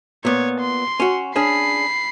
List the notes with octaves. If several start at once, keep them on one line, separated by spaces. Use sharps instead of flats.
A#2 B3 C#5
C6
C#4 F#4
C#4 D4 G#4 B5 C7